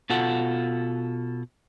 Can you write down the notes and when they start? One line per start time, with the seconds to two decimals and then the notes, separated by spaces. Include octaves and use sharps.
0.10 B2 F4 A4 F#5